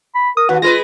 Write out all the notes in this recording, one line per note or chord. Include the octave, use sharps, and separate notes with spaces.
B5
A#4 D#6
D#2 F#4 B4
G#3 F4 A#4 B4 A#6